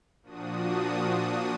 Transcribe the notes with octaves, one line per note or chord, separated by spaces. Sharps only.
A#2 F3 D4 F#4 D#6